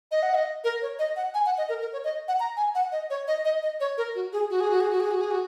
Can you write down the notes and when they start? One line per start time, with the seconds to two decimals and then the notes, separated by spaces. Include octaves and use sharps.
0.11 D#5
0.23 F#5
0.35 D#5
0.64 A#4
0.82 C#5
0.99 D#5
1.16 F#5
1.34 G#5
1.46 F#5
1.58 D#5
1.69 A#4
1.81 A#4
1.93 C#5
2.04 D#5
2.28 F#5
2.40 A#5
2.57 G#5
2.75 F#5
2.92 D#5
3.10 C#5
3.27 D#5
3.45 D#5
3.63 D#5
3.80 C#5
3.98 A#4
4.15 F#4
4.33 G#4
4.50 F#4
4.60 G#4
4.71 F#4
4.81 G#4
4.90 F#4
5.00 G#4
5.11 F#4
5.21 G#4
5.31 F#4